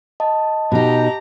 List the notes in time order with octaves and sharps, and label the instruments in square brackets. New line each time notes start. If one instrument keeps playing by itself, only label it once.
[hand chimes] D#5 A5
[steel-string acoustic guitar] B2 D#4 [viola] G4 A#5